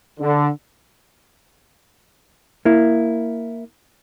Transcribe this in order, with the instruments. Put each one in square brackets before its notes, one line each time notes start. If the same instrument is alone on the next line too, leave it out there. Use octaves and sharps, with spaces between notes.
[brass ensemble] D3
[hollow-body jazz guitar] A#3 E4